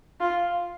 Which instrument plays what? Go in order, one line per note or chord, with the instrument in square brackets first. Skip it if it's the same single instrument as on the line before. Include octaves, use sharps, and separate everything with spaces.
[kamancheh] F4